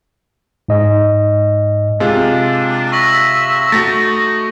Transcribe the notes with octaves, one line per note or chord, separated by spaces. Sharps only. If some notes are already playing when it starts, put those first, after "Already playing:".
G#2 D#5
C3 G#3 D4 F4
E5 C#6 A#6 F#7
A3 D#4 F#4 A6